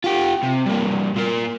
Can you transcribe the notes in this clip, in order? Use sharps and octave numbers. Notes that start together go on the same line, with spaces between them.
F4 G4
C3
G2 A#3
A#2 A#3